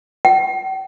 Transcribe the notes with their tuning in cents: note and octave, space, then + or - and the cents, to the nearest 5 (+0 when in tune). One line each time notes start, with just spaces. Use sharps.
G5 -45